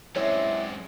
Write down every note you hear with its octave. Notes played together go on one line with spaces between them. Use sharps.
F#2 G#3 C4 E4 C#5 D5 E5